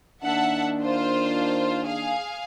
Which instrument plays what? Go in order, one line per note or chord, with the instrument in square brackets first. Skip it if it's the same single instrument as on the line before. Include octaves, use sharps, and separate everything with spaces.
[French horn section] D#3 A#3 D4 [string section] E5 F#5 A5
[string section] F4 C5
G#4 F5